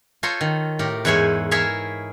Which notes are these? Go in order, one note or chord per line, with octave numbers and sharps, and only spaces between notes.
F4 A4 C5 C#5 A#5 C6
D#3
A2 G4 A#4
E2 G#2 E4 C5 C#5 G#5
E4 G#4 A#4 C#5 E5 F5